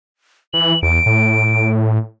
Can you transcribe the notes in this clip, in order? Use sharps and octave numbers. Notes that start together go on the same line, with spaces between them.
E3 F#7
E2 D7
A2